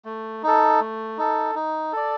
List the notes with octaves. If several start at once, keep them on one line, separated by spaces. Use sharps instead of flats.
A3
D#4 A4
A3
D#4 A4
D#4
A4 D5